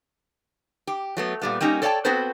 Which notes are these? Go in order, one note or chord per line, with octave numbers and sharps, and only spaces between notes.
G4
F#3 A3 B3
A#2 G3 B3
G3 A#3 C#4 D#4 G4
A4 C#5 D5 E5 G5 A5
B3 C4 F#4 A4 B4 C5